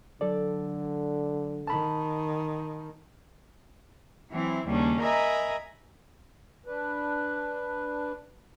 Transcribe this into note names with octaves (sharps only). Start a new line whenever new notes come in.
D3 F#3 A4 D5
D#3 A5 B5
E3 F#3 C4 E4
D#2 C#3 G3 C#4 D4
A#4 D#5 E5 G#5 A#5 B5
D4 B4